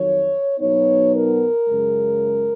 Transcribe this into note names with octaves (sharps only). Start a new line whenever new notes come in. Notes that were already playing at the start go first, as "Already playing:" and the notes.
Already playing: F2 D#3 F#3 C#5
B2 F#3 B3 D#4 C#5
A#4
F#2 C#3 G#3